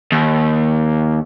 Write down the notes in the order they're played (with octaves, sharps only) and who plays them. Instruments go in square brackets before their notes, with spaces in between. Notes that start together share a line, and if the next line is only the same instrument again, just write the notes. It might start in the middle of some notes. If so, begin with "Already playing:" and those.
[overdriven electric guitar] D#2